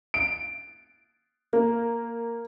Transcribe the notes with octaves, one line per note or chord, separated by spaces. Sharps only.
D7
A#3